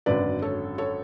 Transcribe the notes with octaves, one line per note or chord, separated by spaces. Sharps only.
G#1 F#2 D3 B4 D5
A4 C#5
A4 C#5